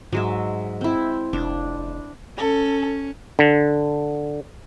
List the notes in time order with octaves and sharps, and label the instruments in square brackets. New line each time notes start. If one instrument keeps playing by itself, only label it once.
[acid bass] G#2 [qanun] F#3 G#3 E5
[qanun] C4 E4
[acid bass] F1 [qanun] D4
[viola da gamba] C#4 [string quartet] A4
[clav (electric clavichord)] D3